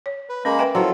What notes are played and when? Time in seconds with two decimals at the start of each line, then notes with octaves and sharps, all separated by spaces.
0.06 C#5
0.29 B4
0.45 G#3 A#3 C#4 A#4 B5
0.59 B4 E5 G5
0.75 F#3 E4 F4 A4 C5 D5